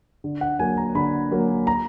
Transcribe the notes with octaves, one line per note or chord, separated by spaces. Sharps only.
D3
F#5
F#3 A#3 G#5
A#5
D3 B5
F#3 A#3
A#5